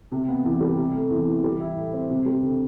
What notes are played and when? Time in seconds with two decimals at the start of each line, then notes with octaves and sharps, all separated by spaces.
0.12 C3
0.28 B3
0.45 E2
0.60 G3
0.77 C3
0.94 A3
1.10 E2
1.27 E3
1.44 G3
1.60 E4
1.76 A2
1.93 C4
2.10 C3
2.26 G3
2.42 D2